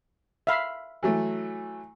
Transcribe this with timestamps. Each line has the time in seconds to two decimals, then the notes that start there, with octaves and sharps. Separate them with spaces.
0.47 E5 F5 B5
1.03 E3 F#3 A3